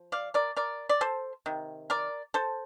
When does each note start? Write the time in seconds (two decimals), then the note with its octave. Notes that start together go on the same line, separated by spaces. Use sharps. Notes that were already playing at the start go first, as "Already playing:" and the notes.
Already playing: F3
0.12 D5 F5
0.34 A#4 D5
0.56 A#4 D5
0.89 D5
1.01 A4 C5
1.46 C3 D#3
1.90 A#4 D5
2.34 A4 C5